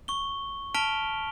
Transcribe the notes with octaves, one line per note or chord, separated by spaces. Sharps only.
C#6 G7
A5 F6 B6 D7 F7 G7